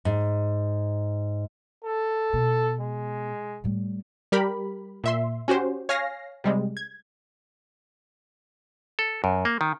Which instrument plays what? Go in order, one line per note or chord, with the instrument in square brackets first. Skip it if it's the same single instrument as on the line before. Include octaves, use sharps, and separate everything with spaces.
[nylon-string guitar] G#2
[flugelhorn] A4
[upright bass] B2
[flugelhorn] G#3
[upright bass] A2 G3
[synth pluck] G3 G4 A#4 B5
A#2 E5 C6
C#4 F#4 G4 C5
C#5 F5 G#5 F6 A#6 C7
C3 G3 G#3
G#6
[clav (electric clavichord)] A4
F#2
A#3
D#3